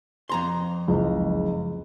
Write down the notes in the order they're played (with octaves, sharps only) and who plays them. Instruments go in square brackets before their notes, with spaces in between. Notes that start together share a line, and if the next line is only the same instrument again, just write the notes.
[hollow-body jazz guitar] F2 A#5 C6
[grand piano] F#1 C#2